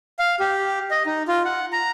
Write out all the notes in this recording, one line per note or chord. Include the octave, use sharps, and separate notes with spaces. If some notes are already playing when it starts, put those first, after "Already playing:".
F5
G4
D#5
D#4
F4
F#5
A#5